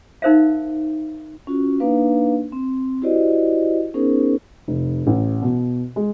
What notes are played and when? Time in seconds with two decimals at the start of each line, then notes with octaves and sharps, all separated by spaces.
0.22 D#4 A#4 C5 E5 F5
1.47 C#4 F4 F#4
1.80 A#3 D4 D#4 B4 F5
2.52 C4
3.02 E4 F#4 G4 C5 D5 D#5
3.94 B3 C#4 D#4 G#4 A#4 C5
4.68 F1
5.07 A1
5.42 B2
5.96 G#3